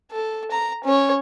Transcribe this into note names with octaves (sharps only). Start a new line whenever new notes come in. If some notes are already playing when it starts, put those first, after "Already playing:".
A4
A#5
C#4 C#5